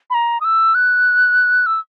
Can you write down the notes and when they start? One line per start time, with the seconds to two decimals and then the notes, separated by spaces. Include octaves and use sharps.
0.10 B5
0.14 A#5
0.41 D#6
0.44 E6
0.75 F#6
1.66 E6